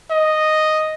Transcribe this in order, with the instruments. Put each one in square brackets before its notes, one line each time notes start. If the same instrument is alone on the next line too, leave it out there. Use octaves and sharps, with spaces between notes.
[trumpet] D#5